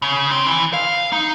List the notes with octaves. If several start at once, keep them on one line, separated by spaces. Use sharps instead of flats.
C#3
C4
E3
F5
D#4